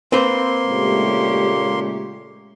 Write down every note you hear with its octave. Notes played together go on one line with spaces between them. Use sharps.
A#3 C4 B4 C5 C6
A#2 C#3 G#3 A3 G4 C#5